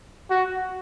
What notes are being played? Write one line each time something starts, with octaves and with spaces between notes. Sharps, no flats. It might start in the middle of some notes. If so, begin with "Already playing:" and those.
F#4